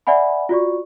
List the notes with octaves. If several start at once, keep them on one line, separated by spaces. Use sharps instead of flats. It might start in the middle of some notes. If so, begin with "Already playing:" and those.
D5 E5 F#5 G#5 B5
F4 F#4 D5 C#6